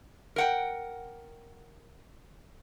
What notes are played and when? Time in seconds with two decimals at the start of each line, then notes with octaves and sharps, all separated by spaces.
0.36 A#4 F#5 G5